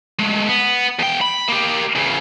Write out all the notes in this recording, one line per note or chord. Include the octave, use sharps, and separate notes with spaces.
G#3 A3
B3
E2 G5
B5
A#3 G4
E2 C#3